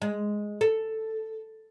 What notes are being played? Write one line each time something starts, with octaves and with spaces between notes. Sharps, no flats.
G#3
A4